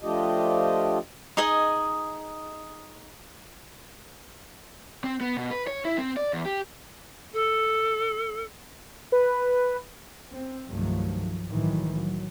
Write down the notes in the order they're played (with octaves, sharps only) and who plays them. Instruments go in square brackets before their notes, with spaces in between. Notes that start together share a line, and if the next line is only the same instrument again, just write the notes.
[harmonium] F3 A3 D4 F4 G4 D#5
[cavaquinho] D#4 G#4 D#5 G#5
[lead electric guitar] C4
B3
B2
B4
C#5
E4
C4
D5
E2
G4
[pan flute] A4
[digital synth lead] B4
[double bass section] C4
C2 G2 D#3 F3 F#3 A3
C2 A2 D#3 E3 F#3
F#3